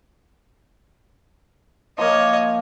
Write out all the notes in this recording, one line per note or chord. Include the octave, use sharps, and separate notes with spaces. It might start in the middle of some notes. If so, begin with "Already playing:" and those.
F3 A#3 C#5 D#5